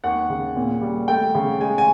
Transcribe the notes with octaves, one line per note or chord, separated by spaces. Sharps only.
D#2 F#5
C#3
A#2
G3
A3 G5
C#3
G#3 G#5
G#5